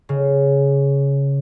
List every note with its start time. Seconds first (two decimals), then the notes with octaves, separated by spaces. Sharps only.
0.09 C#3